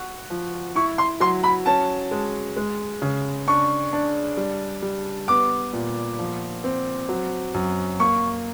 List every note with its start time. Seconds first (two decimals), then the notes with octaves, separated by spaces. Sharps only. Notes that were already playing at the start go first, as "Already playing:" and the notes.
Already playing: F#4
0.30 F3
0.75 E4 C#6
0.98 C6
1.20 F#3 C6
1.44 B5
1.66 C#4 A5
2.11 G#3
2.57 G#3
3.02 C#3
3.48 D4 C#6
3.93 D4
4.37 G3
4.82 G3
5.28 B3 D6
5.73 A#2
6.19 F3
6.64 C4
7.09 F#3
7.54 F#2
8.00 A#3 C#6